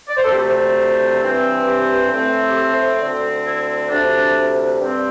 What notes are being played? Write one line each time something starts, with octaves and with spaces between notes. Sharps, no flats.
D5
C5
A4
D2 C3 A3 C4 G4
C5
G2 E3 C4
G4
A2 A3 C4
G4
A4
C5
D2 D3 C4
E4
D2 C3 A3 D4
G2 G3 C4